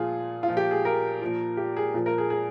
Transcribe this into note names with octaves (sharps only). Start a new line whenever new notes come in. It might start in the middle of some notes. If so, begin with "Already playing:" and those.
Already playing: A#2 F3 F4 G#4
F4
A#2 F3
G4
G#4
A#4
A#2 F3
G4
G#4
A#2 F3
A#4
G#4
G#4